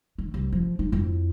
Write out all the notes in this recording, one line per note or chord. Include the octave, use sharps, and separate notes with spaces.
D#3
C2
F3
D#4
F2 E4